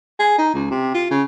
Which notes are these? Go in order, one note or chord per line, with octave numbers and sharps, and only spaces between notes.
G#4
D#4
C#2
C3
F4
C#3